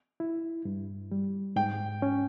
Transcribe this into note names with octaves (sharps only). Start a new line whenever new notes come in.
E4
G2
G3
G#2 G5
C#4